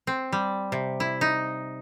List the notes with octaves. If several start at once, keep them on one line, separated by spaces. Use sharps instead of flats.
C4
G3
C3
E4
D#4